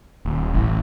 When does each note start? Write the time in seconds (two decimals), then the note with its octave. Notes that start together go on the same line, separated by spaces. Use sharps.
0.25 D#1
0.53 A1